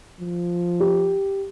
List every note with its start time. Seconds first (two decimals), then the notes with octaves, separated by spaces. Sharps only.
0.20 F3
0.80 G4